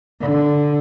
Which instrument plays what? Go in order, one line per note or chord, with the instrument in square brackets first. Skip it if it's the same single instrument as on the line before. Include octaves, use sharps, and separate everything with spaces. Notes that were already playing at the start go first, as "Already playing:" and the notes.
[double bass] D3